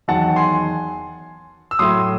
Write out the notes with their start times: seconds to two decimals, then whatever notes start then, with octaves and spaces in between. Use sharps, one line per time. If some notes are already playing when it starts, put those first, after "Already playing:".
0.08 E2 D#3 F#3 F#5 A5
0.36 G#5 C6
1.71 E6
1.79 A2 F#3 C6 D#6